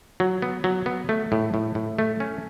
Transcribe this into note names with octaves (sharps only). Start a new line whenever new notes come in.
F#3
B3
F#3
B3
A3
A2
A2
A2
A3
C#4